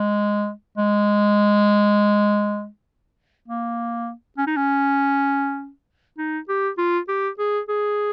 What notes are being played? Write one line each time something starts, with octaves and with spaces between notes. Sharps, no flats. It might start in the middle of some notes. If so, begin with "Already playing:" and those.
Already playing: G#3
G#3
A#3
C#4
D#4
C#4
D#4
G4
F4
G4
G#4
G#4